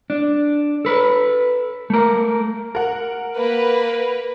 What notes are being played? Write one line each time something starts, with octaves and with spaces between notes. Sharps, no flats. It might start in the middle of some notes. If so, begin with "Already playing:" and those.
D4
A4 B4
A3 A#4
A#4 F#5
A#3 B4